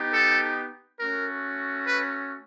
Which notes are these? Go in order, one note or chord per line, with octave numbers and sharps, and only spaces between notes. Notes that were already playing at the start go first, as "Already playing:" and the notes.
Already playing: B3 D#4 G4
A4
A3 C#4 F#4 A#4
B4